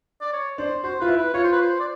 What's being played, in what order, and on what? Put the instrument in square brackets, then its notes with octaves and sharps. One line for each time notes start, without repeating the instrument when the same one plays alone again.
[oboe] D5
C#5
[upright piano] D4 [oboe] C5
[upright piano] F#4 [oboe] C5
[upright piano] F4 [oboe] B4
[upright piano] E4
[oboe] B4
[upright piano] F4 [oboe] C#5
[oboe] C5
B4
C5
D5